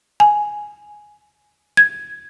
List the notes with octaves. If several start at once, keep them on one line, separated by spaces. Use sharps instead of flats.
G#5
G#6